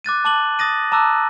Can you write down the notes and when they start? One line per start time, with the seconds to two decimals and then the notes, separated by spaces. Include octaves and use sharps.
0.04 D6 F#6 A6 D#7
0.25 A5 D6 F#7
0.59 D#6 A6 A#6 D#7
0.92 A5 A#5 D6 E6 F#6